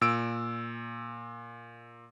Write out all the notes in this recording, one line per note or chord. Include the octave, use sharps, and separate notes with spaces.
A#2 E6 D7